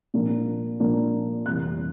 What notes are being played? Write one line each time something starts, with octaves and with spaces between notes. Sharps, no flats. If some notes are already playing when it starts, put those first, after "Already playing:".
A#2 F3 A#3 D4
A#2 F3 A#3 D4
F1 F2 C3 E3 G3 F#6